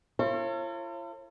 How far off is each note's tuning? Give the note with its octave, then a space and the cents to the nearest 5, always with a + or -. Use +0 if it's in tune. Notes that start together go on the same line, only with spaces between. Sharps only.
F4 -45 A4 +45 C#5 -40